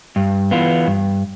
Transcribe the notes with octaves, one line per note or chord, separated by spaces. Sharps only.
G2
E3 B3 F4
G2